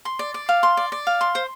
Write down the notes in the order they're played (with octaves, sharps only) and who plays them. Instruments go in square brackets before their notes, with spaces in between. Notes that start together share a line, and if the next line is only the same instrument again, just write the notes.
[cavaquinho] C6
D5
D5
F5
C6
D5
D5
F5
C6
C5